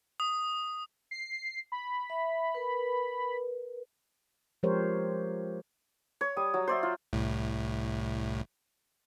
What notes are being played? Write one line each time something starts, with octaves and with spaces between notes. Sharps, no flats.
D#6
C7
B5
E5
A#4 B4
F3 G#3 G4 A#4 C5 C#5
C#5
G3 D#6
F#3
C5 D5 E5
F4
C2 A2